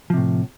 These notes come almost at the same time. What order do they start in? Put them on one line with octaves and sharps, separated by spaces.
F3 C3 A2